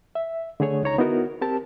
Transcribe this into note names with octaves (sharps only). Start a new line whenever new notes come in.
E5
D3 A3 G#4 C#5
C#2 D#4 C#5 A#5
B3 D#4 E4 F#4 A#4
C4 G4 A#4 A5